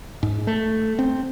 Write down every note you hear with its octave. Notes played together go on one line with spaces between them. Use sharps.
G#2
A3
C4